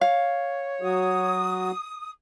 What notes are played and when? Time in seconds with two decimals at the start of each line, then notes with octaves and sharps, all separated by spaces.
0.01 C#5 F5
0.82 F#3 F#4 D#6